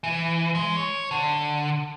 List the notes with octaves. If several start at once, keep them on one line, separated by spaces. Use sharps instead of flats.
E3
G#3
C#5
D3